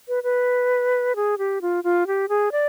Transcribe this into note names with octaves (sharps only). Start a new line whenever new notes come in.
B4
B4
G#4
G4
F4
F4
G4
G#4
D5